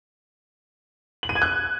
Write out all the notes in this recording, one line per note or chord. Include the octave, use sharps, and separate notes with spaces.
F#7
D#7
G#6
F#6